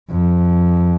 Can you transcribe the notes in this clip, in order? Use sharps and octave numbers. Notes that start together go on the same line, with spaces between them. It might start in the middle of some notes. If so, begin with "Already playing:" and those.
F2